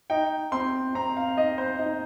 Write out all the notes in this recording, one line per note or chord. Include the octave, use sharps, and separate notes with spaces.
D#4 G5
C4 C6
C4 A#5
F5
D#4 D#5
C5
D#4